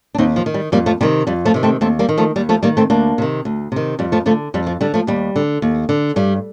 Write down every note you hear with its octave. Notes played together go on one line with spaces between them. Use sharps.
D4
D#2 C4 D#4
F3
D#3
G3
F2 G3 A#3
F3 A3
C3 D#3 G3
F2 G3
F3 A3
C3 D#3
A3 C4
D#2 A3 C4
G3 A#3
D#3
F3 A3
D#2 G3
F3 A3
D#3 G3 A#3
A3 C4
D2 A#3 D4
C3 D#3
D2
C3 D#3
F2 G3
F3 A3
D3 F3 A3
F2 G3
F3
D3 G3
F3 A3
D#2 G3
D3
D#2
D3
G2 G3